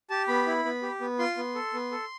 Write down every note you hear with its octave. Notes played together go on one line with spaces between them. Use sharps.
G4 A5
B3 B5
E4
B3
G4
B3
F4 C6
B3
A4
B3
A4